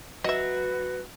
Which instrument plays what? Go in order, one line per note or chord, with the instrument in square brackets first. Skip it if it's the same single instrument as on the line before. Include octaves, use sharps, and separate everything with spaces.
[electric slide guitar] F#3 F#4 [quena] B4 [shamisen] D#5 E5